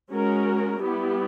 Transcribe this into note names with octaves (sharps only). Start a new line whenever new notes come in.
G#3 C#4 F#4 A#4
G3 B3 E4 G4